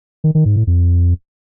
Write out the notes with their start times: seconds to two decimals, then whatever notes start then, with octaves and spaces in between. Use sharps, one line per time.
0.24 D#3
0.35 D#3
0.46 G#2
0.56 A2
0.67 F2